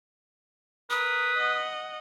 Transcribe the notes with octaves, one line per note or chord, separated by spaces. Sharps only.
A#4 B4 D#6
D#5 F#5